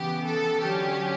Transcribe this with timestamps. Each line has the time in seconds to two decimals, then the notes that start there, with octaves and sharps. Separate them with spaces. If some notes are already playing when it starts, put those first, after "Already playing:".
Already playing: C#3 E3 B3 G4
0.25 A4
0.63 D3 F#3 C#4 G4